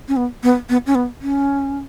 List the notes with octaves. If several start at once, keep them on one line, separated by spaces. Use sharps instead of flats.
C#4
B3
B3
B3
C#4
B3
C#4